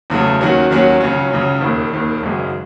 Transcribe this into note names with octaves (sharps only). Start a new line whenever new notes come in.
E2 C#3 F#3 A3
D#2 D#3 F#3 C#4 F#4
D#2 D#3 F#3 C#4 F#4
C#2 C#3 F#3 C#4
C#2 C#3 F#3 C#4
E1 D#2 D#3
E1 D#2 D#3
G#1 F#2 C#3 G#3